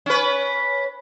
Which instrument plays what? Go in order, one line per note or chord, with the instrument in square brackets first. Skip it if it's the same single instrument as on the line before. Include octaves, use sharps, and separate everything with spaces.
[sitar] C#4 B4